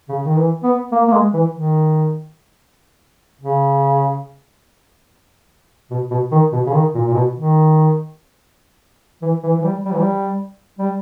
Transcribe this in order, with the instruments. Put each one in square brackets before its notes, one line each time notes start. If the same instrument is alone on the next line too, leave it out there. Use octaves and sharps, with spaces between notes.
[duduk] C#3
D#3
E3
B3
A#3
A#3
G#3
E3
D#3
C#3
B2
B2
D#3
B2
C#3
D#3
A#2
A#2
B2
D#3
E3
E3
E3
G3
G3
E3
G3
G3